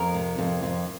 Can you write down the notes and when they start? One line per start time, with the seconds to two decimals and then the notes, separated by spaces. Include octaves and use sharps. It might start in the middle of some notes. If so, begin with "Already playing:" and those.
Already playing: F2 A#4
0.14 C3
0.38 F2
0.63 F2